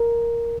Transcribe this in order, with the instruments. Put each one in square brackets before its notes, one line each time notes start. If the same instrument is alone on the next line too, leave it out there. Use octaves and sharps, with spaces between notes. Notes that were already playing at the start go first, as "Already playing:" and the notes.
Already playing: [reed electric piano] A#4